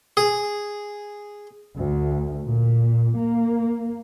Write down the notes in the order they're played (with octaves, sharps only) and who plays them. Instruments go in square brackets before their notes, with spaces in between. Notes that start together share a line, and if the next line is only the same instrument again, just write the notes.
[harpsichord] G#4
[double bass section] D2
A#2
A#3